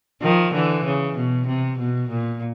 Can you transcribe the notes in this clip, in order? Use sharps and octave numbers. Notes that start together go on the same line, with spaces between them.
D#3 F3
D3 E3
C#3
B2
C3
B2
A#2